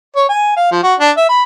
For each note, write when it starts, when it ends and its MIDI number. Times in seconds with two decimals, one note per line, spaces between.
0.16 0.25 73
0.29 0.53 80
0.57 0.70 77
0.71 0.83 53
0.83 0.95 66
1.00 1.11 62
1.17 1.26 76
1.29 1.43 83